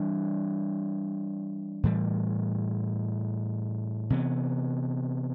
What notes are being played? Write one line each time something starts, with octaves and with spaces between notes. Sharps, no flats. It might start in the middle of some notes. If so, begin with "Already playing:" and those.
Already playing: E3 G3 D4
A2 E3 G3
C3 E3 B3